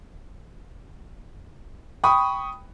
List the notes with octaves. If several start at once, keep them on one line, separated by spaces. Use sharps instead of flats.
G5 B5 C#6 D#6